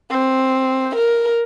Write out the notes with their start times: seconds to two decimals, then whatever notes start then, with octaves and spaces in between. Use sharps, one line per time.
0.11 C4
0.96 A#4